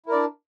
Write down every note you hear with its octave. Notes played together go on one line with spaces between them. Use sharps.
D4 E4 A#4 D5